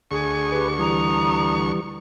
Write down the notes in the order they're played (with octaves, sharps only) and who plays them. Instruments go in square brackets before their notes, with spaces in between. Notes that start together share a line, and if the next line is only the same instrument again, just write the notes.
[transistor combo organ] D2 C#6 [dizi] G#4
[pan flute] G4 [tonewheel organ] B4
[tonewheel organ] E3 G3 [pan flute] A#5 [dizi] D#6